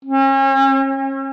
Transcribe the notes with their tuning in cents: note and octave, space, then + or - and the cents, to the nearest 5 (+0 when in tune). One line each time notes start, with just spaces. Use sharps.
C#4 -40